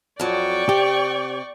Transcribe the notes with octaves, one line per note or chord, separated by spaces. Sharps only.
F2 F#3 D5 G5 C#6
C3 G4